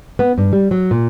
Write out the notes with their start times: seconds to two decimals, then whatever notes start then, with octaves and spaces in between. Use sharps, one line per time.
0.19 B3
0.38 G2
0.53 G3
0.71 F#3
0.91 A#2